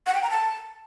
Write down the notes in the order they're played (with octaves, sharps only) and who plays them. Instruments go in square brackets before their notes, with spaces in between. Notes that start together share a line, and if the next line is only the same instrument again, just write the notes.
[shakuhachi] F#5
G5
A#5
A5